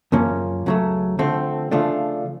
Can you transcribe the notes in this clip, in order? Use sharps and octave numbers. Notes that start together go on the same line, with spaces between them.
F#2 C#3 F3 A#3 C#4
C#2 C#3 F#3 A3
D3 F3 A3 C4
C#3 F3 A3 D4 F4